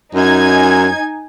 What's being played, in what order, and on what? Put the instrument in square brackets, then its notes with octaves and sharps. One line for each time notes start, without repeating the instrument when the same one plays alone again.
[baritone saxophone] F#2 [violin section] D#4 G#5 G#6